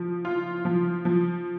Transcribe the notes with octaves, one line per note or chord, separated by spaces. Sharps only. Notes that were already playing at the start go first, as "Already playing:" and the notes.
Already playing: F3
F4
F3
F3